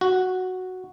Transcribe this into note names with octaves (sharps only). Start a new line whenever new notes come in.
F#4